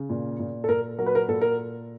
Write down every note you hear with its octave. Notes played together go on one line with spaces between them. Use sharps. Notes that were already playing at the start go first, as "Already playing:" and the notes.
Already playing: C#3
A#2
A#2
A4
A#2 A#4
F#3 A#4
B4
A#4
A#2 A4
A#4